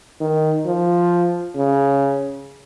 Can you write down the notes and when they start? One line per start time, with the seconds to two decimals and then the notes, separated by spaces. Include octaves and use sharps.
0.20 D#3
0.66 F3
1.56 C#3